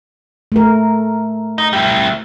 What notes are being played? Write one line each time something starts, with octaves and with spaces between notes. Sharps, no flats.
A3 A#4
D#4
G3 E4